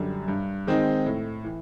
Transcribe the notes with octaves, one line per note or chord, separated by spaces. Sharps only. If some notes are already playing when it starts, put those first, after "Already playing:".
Already playing: F#2 D3 G3
G2
D#3 G#3 C4 D#4
A2
E3